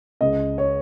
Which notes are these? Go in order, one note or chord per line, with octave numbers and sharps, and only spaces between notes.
C#2 D#5
C#5